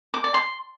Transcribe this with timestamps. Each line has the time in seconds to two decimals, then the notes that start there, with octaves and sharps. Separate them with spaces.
0.14 D6
0.24 D5
0.34 C6